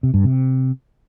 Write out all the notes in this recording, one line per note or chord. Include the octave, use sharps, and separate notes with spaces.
C3
G2
C3